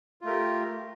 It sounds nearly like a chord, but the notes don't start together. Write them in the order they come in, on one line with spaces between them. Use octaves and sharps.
F4 A3 A#4 G4